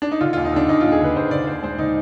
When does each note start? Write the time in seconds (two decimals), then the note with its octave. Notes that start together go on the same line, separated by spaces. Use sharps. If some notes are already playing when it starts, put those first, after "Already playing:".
0.02 D4
0.12 D#4
0.21 D3 F4
0.33 F4
0.37 D#2
0.45 D#4
0.53 D3 D4
0.68 D#2 D#4
0.81 F4
0.84 D#2
0.92 G#4
1.01 D3 B4
1.16 D#2 C5
1.31 D3 D5
1.47 D#2 C5
1.63 G#3 C5
1.78 D3 D#4